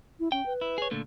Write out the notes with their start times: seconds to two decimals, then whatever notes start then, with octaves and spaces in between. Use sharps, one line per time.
0.20 E4
0.32 C#4 G5
0.46 B4
0.61 E4
0.78 G#4 C#5
0.91 A#2 D3 A3